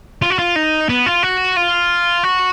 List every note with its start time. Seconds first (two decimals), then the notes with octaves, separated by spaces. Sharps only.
0.22 F4
0.30 F#4
0.39 F4
0.56 D#4
0.89 B3
1.06 F4
1.23 F#4
1.57 F4
2.23 F#4